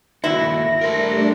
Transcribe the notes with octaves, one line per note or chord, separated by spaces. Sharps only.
D#2 E4 F#4 A#6
G3 A3 D4 A#4 C5